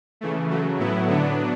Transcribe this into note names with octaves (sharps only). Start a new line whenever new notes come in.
C#3 E3 A3
C#3 F#3 A3
A2 F#3 B3 E4
D3 F#3 B3 D4